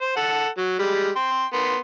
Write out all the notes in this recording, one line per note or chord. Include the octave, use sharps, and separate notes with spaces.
C5
A4 F#5
F#3
G3 G#3
G5 C6
B3 A#4 C6